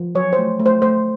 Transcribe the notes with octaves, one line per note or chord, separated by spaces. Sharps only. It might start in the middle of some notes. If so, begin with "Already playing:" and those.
Already playing: F3
F#3 C#5
C5
A3
A3
C5
A3 C5